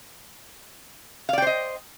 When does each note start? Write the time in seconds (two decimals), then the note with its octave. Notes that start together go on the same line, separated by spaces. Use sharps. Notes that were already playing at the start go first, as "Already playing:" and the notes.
1.29 F5
1.33 D5
1.38 G5
1.42 C5
1.47 D#5